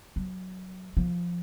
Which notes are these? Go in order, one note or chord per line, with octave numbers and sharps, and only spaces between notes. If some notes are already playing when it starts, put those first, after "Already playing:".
F#3
F3